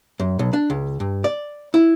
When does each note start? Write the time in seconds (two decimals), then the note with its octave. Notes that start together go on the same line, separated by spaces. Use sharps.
0.20 F#2
0.39 B1
0.53 D4
0.70 C#2
1.00 G2
1.24 D5
1.74 E4